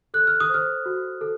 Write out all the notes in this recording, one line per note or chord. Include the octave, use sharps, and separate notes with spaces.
A4 F#6
F6
D#6
C5 F6
F#4
A4